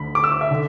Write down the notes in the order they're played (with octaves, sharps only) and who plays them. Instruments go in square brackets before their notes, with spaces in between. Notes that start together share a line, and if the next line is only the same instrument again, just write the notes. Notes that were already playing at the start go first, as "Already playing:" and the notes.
Already playing: [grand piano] D2 D3 B5
D6
E6
D6
E5
D3